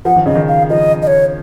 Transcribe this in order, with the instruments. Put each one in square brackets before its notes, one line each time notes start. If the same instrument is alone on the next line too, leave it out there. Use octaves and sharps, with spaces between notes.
[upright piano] F3 [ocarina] F#5
[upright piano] D#3
[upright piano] C#3 [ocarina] D#5
[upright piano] D#3
[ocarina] F5
[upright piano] F3 [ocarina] D#5
[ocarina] D#5
C#5